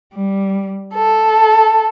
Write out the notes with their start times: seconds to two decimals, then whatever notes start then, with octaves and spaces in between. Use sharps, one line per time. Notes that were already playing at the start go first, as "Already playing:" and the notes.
0.13 G3
0.95 A4